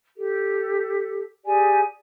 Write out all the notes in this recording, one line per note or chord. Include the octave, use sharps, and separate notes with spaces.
G4 A4
G4 G#4 D5 G#5